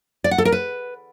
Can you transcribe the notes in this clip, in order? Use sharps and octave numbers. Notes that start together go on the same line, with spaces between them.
D5
F#5
A4
A#4
B4